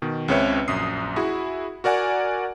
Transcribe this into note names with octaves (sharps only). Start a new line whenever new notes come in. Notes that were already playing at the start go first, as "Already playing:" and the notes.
B2 D#3
C#2 C#3 C4 B4 C#5 E5
A#1 F#2 D#6 C7
E4 F#4 G#4
F#4 A#4 D5 F#5 G#5